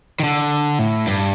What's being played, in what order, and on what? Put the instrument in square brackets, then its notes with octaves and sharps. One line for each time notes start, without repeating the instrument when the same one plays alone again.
[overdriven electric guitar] D#3
D3
A2
G2